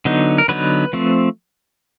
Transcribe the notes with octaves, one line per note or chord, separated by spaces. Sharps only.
D3 F#3 B3 D#4
A#4
D3 F#3 B3 D#4 B4
F3 A3 C4